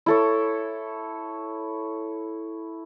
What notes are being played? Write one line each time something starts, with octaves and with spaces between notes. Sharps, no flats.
E4 A4 C#5